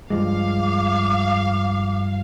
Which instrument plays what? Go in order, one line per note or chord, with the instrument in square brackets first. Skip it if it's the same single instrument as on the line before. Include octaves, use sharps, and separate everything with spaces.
[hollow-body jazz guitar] G2 F3 G#3 [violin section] F5 [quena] D6